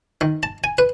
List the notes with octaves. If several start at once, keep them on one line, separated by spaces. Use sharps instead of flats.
D#3
A5
G#5
B4